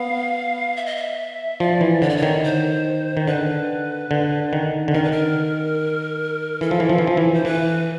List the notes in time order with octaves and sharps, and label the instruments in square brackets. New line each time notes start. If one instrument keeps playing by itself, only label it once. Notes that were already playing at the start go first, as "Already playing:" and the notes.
Already playing: [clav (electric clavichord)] B3 [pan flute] F5
[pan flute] E5
D#5
E5
[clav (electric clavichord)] F3 [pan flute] D5
[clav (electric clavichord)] E3
[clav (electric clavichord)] D3 [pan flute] C#5
[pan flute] D5
C#5
[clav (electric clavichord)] D#3
[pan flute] C5
[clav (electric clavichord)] D#3
[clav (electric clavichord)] D3 [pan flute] B4
[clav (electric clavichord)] D3
D#3
D3
[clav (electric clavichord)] D#3 [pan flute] A#4
[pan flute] B4
A#4
[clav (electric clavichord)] E3 [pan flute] A4
[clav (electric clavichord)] F3
E3
F3
E3
F3
E3
[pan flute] C5
[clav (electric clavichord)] E3 [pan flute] B4